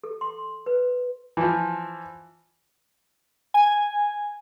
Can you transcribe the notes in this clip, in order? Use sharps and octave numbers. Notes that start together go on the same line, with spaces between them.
A4
C6
B4
E3 F3
G#5